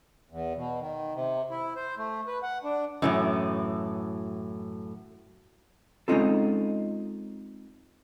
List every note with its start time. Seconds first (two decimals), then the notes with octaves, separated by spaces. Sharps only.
0.31 E2
0.56 B2
0.81 D#3
1.14 C3
1.51 E4
1.76 C5
1.98 A3
2.27 B4
2.43 F#5
2.64 D4
3.02 F#2 A2 E3
6.08 G#3 C4 C#4 D#4 F4 A4